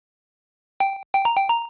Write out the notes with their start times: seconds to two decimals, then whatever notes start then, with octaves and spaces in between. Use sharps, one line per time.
0.80 G5
1.15 G5
1.25 A#5
1.36 G5
1.50 A#5